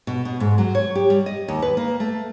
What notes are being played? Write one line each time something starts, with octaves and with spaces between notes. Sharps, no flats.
B2
B2
G#2
F#3
C#5
G4
G3
D#5
D#2
B4
A#3
A3